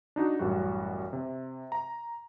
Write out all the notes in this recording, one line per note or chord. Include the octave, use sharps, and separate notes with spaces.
D4 D#4 F#4
A1 F#2 G3 F#4
C3
A#5